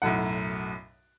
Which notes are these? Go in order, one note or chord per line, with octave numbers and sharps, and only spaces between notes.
B1 F#2 A2 F#5